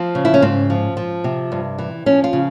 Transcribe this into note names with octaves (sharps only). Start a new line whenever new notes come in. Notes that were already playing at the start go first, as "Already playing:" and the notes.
Already playing: F3 C4
C#3
E4
C#4
G#2 C4
F3
F3
C3
G2
E3
F3 C#4
F4
C#3